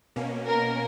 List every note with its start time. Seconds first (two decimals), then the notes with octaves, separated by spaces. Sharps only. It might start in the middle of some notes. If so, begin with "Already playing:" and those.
0.16 B2 A#3 C#4
0.47 A#4